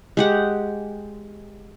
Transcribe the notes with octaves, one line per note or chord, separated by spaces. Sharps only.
G#3 G4 F#5